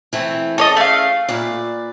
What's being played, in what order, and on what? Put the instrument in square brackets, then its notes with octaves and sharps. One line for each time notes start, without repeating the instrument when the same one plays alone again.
[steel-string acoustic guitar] E3 A3 C4
[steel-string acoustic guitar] C#4 G#4 [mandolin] A4 C#5 D#5
[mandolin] A3 F5
[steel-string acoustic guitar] A#2 B4 D5